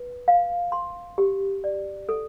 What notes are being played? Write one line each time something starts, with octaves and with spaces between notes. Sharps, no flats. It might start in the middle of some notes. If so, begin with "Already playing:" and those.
Already playing: B4
F5
C6
G4
D5
A4